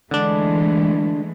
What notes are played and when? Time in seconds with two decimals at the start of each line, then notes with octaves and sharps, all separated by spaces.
0.11 D3 E3 G#3 A3 D4